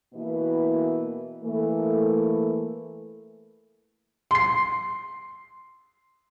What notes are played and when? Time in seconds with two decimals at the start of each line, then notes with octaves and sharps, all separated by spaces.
0.14 B2 E3 A#3 E4 F#4 B4
1.44 E3 A3 A#3
4.31 C6 C7